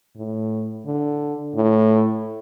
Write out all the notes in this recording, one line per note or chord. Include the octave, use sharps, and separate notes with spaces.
A2
D3
A2